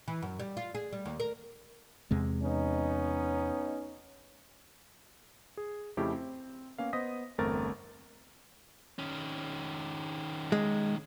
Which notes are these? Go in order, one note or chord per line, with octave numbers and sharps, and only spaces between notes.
E3
F#2
G3
F4
G#4
G3
D#2
A#4
E2 C3 G#3
B3 C#4 D#4
G#4
F2 C#3 A3 E4 G4
C4
A#3 B3 C#4 A#4 F5
B3 C5 D#5 D#6 A#6 B6
G1 E2 A3 C4 A#4 A6
D#3 C#4
G#3